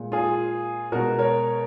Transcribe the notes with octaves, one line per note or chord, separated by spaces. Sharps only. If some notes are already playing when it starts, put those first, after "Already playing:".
Already playing: A#2 G#3
F4 G#4
B2 G#3 F#4 A#4
A#4 C#5